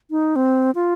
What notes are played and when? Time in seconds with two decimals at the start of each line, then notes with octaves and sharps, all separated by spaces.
0.11 D#4
0.36 C4
0.75 F4